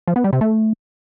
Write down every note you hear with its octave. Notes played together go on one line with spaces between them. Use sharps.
F3
B3
G3
C3
A3